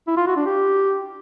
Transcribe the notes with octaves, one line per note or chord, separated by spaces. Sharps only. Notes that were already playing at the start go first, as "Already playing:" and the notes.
E4
F4
F#4
D4
G4